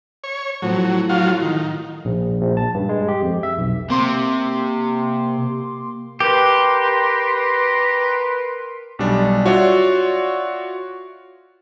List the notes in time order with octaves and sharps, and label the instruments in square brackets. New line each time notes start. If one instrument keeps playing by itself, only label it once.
[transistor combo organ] C#5
[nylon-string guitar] A2 F3 C4 [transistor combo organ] F#3
[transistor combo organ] F#3 F4
D#3
[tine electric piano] A#1
A#1
A5
G2
G#3
G4
F2
E5
B1
[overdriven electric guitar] C3 [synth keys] A#3 C6 D6
[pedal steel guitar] G4 [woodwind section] A#4 B4 C6
[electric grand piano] B1 G3 D4
F4 F#4 C#5 D5 E5